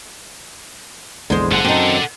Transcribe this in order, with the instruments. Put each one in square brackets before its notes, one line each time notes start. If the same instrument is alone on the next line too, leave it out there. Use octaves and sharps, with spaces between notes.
[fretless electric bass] A#1 E2 D3 [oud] G#3 C5
[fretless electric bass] F#1 [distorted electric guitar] A4 F#5
[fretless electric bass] F#2 [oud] C4 D#4